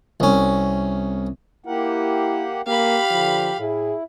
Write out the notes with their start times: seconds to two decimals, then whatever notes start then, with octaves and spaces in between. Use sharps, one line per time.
0.20 C2 C#4
1.66 A#3 E4 G4 A#4 F#5
2.67 A#3 G4 F5 B5
3.11 D3 F3
3.60 A2 E4 G#4